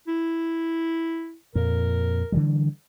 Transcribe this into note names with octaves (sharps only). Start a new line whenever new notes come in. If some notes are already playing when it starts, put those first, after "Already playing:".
E4
F2 A#2 A#4
D3 E3 G3